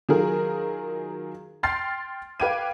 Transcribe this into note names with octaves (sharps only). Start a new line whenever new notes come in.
D#3 F#3 F4 G#4 A#4
G5 C6 F6 A6 C7
B4 F5 G5 D6 G#6 D#7